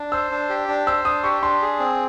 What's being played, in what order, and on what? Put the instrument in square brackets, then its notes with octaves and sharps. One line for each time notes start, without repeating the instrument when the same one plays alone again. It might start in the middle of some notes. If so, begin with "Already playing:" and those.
Already playing: [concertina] D4
[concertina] C5 [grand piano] E6
[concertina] D4
G4
D4
[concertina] C5 [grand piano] E6
[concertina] D4 [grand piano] D#6
[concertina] G4 [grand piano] C#6
[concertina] D4 [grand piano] C6
[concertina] G#4
C4